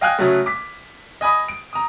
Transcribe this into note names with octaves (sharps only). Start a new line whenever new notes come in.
D#5 F5 G5 G#5 F6 F#6
C#3 F#3 A3
D6 B6
D#5 G#5 B5 D#6
D7
A#5 D#6